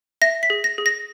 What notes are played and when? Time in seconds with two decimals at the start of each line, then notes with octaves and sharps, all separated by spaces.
0.22 E5 A#6
0.43 B6
0.50 G#4
0.64 A#6
0.78 G#4
0.86 A#6